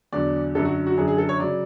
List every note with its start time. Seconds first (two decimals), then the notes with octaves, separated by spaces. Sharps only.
0.12 E2 D3 F#3 D5
0.55 F#2 D3 F#3 A4
0.65 F#4
0.87 F#4
0.97 F#2 D3 F#3 G#4
1.08 G#4
1.18 A4
1.29 C#5
1.39 C#3 F#3 D5